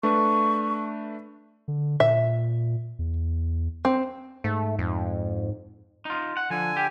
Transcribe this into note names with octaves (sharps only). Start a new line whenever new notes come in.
A3 D4 B4 C#6
D3
A#2 E5
E2
C4
G#2 A3
F2
D#4 F4
F#5
D3 F3 G#5
G4